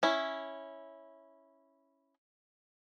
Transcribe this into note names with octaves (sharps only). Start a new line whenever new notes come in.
C#4 E4